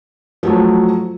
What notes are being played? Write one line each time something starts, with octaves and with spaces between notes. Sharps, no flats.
F3 F#3 A3